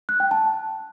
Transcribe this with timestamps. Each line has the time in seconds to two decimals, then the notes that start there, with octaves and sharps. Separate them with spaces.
0.09 F#6
0.20 G5
0.31 A5